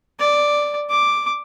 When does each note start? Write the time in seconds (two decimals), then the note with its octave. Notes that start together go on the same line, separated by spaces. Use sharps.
0.20 D5
0.90 D6